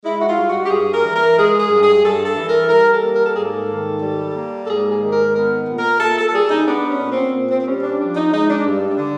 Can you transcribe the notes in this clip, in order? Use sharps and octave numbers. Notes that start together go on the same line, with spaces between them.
G#3 E4
F#4
F4
G2
F#4
G4
G2 G#4
A#4
E3
A#4
G#3 G#4
G#4
G2
G#4
G2 A4
A4
E3
A#4
G3 A#4
A4
A#3
A#4
A4
G#2 G#4
A4
D#3
G3
A#3
A4
G#2 G#4
G#4
D#3
A#4
B3 A#4
A#2
A#4
A#2 A4
A4
A4
G3 G#4
D#4
B3 D4
C#4
A#2
C4
A#2
C4
C4
G3 C#4
D4
F3 D4
D#4
G#3 D#4
D4
G2
D4
D3